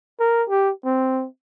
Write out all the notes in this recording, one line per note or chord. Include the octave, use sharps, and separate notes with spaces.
A#4
G4
C4